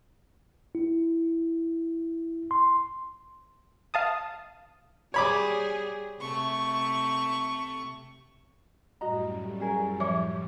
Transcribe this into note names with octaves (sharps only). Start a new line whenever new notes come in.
E4
C6
F5 A5 D#6
G3 G#4 C#5 B5 D6
C3 A3 C#6
F#2 A2 G3 F#4 D#5 A#5
C#4 G#4 A#4
F3 C#5 E5 D6